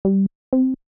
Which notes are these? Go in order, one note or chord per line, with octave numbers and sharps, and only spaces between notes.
G3
C4